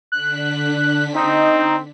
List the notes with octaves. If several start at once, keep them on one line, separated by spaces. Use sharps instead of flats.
D3 D4 F#6 B6
C4 D#4